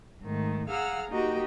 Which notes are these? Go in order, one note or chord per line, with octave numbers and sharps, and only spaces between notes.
G#2 D#3 A3
G#4 F5 F#5 A#5 E6 F6
A#3 D#4 F#4 G4 D#5 G5